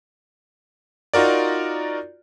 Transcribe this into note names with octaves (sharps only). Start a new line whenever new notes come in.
D#4 F4 F#4 A#4 D5